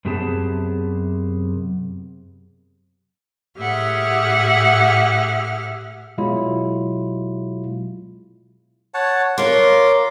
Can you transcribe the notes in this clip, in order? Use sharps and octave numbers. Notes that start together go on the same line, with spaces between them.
F#2 C3 B3 G4 G#4 A5
A2 G4 G#4 E5 F#5 F6
B2 F#3 G#3 E4 F4
C#5 F#5 A5
F4 A#4 C#5 C6 D6